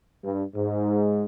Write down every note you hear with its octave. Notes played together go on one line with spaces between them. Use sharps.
G2
G#2